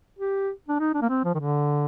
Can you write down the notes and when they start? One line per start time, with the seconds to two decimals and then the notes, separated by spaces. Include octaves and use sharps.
0.19 G4
0.68 D4
0.79 D#4
0.94 D4
1.02 A#3
1.09 C4
1.24 F3
1.35 D#3
1.39 D3